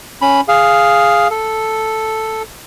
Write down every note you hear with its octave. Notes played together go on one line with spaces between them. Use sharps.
C#4 B5
G#4 F5
A4